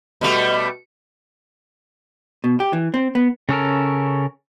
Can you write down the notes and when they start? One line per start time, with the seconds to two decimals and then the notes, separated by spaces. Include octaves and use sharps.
0.21 B2 G3 A3
2.44 B2
2.60 G4
2.73 E3
2.94 C4
3.15 B3
3.49 C#3 C#4 A4 A#4